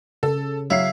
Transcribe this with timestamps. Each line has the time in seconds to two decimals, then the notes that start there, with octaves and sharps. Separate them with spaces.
0.23 C#3 A4
0.70 F#3 E4 F5 C7